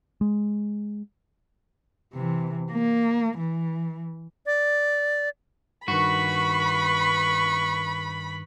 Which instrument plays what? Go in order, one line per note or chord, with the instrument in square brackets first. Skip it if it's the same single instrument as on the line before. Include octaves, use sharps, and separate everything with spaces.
[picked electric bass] G#3
[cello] C3 E3
A#3
E3
[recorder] D5
[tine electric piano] G2 D#3 [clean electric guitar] F#4 [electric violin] B4 C#6 [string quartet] B5